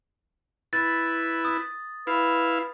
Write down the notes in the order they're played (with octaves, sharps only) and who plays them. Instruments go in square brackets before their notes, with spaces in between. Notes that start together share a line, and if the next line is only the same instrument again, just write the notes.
[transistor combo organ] E4 B4 [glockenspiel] A6
[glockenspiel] D#6
[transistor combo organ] E4 F5 [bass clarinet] B4